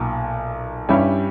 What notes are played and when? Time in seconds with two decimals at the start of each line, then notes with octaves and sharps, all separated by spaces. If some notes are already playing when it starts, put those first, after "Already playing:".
Already playing: B1 A#2
0.89 G2 G3 C#4 E4 G4